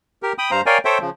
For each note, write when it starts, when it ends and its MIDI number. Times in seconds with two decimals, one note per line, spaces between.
0.23 0.33 67
0.23 0.33 70
0.38 0.51 79
0.38 0.51 83
0.38 0.51 87
0.51 0.61 43
0.51 0.61 72
0.51 0.61 77
0.51 0.61 82
0.66 0.78 70
0.66 0.78 73
0.66 0.78 74
0.66 0.78 77
0.66 0.78 79
0.66 0.78 80
0.85 0.98 69
0.85 0.98 72
0.85 0.98 73
0.85 0.98 76
0.85 0.98 79
1.01 1.10 49
1.01 1.10 53